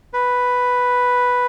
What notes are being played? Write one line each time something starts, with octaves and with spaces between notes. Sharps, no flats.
B4